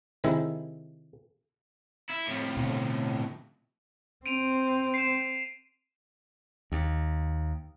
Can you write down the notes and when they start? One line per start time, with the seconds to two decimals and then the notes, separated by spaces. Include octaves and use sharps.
0.24 C3 D#3 G#3 E4
2.10 E4
2.28 F2 A2
2.57 B2 D3
4.26 C4 D7 D#7 F7
4.94 C7 E7
6.72 D#2